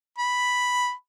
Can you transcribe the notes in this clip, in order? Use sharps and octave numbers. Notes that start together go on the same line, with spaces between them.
B5